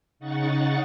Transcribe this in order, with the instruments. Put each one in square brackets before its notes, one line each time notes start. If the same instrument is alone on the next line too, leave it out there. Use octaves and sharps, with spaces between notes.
[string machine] C#3 D#4 F#5 C#6 A6